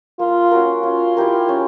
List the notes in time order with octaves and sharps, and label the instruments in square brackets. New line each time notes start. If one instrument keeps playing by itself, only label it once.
[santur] A#3 [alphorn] F4
[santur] C#4 F#4 A#4
[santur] C#4 [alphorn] F4
[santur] E4 G4 A#4
C#4